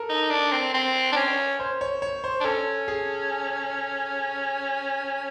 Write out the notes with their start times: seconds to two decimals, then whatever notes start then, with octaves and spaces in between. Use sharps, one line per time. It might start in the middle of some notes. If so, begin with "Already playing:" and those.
Already playing: A4 A#4
0.09 D#4
0.30 D4
0.52 C4
0.74 C4
1.12 D4
1.16 C#4
1.60 C5
1.81 C#5
2.02 C#5
2.24 C5
2.40 D4
2.44 C#4 A4
2.88 G#4